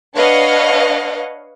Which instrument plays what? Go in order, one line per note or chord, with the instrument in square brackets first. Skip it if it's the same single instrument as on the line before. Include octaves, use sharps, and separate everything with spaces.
[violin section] D4 B4 C#5 D#5 F5 F#5